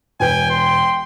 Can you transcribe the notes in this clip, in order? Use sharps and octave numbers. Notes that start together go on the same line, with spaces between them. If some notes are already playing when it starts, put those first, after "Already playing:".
E1 B4 G5 G#5
C6